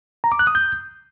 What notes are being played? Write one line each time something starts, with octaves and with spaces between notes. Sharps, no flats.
A#5
D6
F#6
D#6
G6